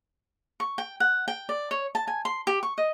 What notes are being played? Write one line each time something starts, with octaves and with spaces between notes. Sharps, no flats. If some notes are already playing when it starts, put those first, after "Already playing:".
C#6
G5
F#5
G5
D5
C#5
A5
G#5
C6
G4
C#6
D#5